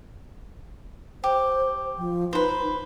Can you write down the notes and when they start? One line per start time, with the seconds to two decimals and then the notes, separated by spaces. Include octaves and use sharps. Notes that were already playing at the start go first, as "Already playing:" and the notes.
1.24 G4 C5
1.98 F3
2.33 D#4 B4 C5